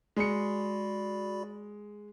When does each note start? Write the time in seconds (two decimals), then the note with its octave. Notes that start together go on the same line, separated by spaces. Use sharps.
0.16 G#3 F#4 D5 B5 C#7